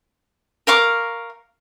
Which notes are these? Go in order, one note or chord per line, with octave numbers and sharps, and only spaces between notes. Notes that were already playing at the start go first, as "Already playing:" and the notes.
A#4 F5 C#6 D6